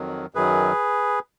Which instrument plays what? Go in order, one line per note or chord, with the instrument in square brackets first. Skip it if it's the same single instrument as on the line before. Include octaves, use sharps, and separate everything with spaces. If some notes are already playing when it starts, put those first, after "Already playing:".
Already playing: [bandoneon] F2 D#3 F#3
F#2 D#3 F#3 G#4 B4